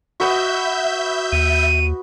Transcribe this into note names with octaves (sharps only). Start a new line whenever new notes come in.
F#4 B4 D#5 E5 G6
D#2 D#7